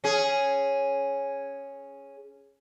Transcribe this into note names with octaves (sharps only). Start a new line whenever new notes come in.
C#4 G#4